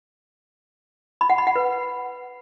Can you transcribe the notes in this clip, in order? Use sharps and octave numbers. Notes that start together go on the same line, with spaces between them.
B5
F#5
B5
F#5
B4